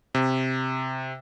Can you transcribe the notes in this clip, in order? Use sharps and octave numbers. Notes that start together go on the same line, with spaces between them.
C3